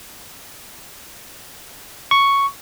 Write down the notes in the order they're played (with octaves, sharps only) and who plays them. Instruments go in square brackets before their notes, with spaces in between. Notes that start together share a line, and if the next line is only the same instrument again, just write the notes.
[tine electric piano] C#6